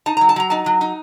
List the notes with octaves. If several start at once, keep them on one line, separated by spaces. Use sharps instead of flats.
D#4 A5
F#3 A#5
A5
F#3 A#5
D#4 A5
F#3
D#4